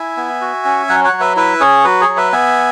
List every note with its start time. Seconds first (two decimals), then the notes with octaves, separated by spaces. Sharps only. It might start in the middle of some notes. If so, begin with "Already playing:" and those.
Already playing: E4 E5 G#5
0.17 B3
0.41 F#4
0.65 C#4
0.89 F#3 C#5 F#5
1.04 C#5 F#5
1.13 F#3
1.20 B4 E5
1.36 E4 B4 E5
1.60 C#4 G#4 C#5
1.84 F#3 F#4 B4
2.01 G#4 C#5
2.08 F#3
2.17 B4 E5
2.32 B3 E5 G#5